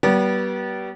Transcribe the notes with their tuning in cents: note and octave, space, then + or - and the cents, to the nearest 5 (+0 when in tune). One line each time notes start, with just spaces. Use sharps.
G3 -35 B3 -25